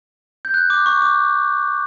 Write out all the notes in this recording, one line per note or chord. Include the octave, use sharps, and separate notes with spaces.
G6
F#6
D6
C#6
D6